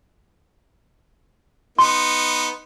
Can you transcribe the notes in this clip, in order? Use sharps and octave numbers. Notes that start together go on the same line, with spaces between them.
B3 D#4 C6